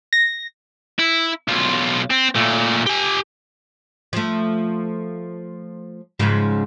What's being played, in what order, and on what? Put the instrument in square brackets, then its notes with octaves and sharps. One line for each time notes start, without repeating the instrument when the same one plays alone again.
[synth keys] A#6
[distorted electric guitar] E4
B1 F4
C4
A#2 A3
G4 G#5
[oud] F3 A3
G#2 C#3 F3